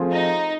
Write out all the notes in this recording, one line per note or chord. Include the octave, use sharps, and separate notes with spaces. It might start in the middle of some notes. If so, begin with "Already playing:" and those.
Already playing: F3 A3 C4 F4 G#4
D#4